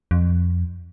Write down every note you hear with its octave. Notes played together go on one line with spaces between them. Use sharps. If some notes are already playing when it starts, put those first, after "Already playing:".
F2